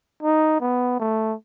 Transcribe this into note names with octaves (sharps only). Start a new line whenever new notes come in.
D#4
B3
A3